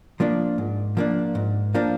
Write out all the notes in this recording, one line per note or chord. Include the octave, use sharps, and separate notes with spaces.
F3 A#3 D4
G#2
F3 A#3 D4
G#2
F3 A#3 D4